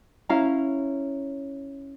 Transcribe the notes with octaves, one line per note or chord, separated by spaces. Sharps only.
C#4 E4 F5 A#5